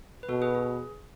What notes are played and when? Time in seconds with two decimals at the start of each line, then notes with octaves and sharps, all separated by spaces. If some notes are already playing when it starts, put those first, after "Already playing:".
0.23 B4
0.29 B2 F#4 A4
0.42 G#4 B4
0.55 G#4